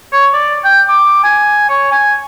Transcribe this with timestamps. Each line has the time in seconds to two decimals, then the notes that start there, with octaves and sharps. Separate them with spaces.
0.12 C#5
0.34 D5
0.64 G5
0.88 D6
1.24 G#5
1.69 C#5
1.92 G#5